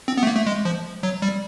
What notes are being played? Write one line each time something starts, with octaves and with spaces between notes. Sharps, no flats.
C4
B3
A3
A#3
A3
G#3
F3
F#3
G3